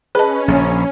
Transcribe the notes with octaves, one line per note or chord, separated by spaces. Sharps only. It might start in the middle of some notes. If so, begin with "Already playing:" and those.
C#4 G#4 B4 D#5 A5
A#1 C#3